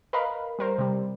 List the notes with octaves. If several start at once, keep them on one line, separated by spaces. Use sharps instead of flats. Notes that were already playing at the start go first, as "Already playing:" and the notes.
A#4 B4 D#5 F5 B5
G3 A#4 C5
C3 G3